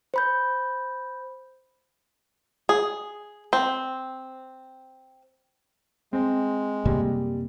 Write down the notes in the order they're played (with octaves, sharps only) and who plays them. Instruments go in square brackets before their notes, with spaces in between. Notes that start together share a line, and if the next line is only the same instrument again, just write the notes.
[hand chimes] C5 B5 G6
[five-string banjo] G#4
C4
[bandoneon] G#3 [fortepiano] C4
[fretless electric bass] F#2 C3 A#3 [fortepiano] G3